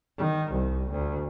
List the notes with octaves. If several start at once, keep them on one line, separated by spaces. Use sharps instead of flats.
D#3
C2
D2